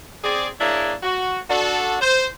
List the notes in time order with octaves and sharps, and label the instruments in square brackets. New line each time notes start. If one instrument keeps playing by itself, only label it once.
[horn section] C4 G#4 D5
A#3 D4 E4 G#4 A#4 C#5
F#4
D4 F#4 A4
C5